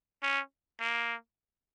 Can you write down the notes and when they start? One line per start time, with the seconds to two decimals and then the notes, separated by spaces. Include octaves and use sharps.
0.23 C#4
0.80 A#3